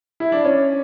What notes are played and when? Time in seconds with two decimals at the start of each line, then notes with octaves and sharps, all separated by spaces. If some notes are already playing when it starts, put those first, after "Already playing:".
0.20 E4
0.32 D4
0.45 C#4